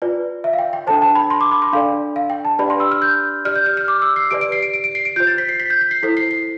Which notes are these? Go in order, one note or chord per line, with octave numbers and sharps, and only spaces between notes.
F4 B4 D5
E5
F5
G5
G5
D4 A4 C5 A5
A5
B5
C6
D6
B5
C6
D4 A4 D5 F5
F5
G5
A5
D4 G4 B4 D5 B5
C6
E6
F6
G6
G4 D5 F6
G6
F6
F6
D6
E6
C7
G4 B4 D5 D7
D7
C7
D7
D7
D7
C7
D7
F4 C5 G6
A6
B6
C7
B6
G6
B6
C7
E4 A4 C5 B6
C7
C7